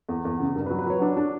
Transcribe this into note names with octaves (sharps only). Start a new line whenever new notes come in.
E2
E2
C#3
G2 A#4
B4
F#3
B4
F#3 C#5
D4
D4